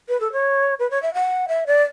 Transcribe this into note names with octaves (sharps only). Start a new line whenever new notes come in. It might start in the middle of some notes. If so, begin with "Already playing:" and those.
B4
A4
C#5
B4
C#5
E5
F#5
E5
D5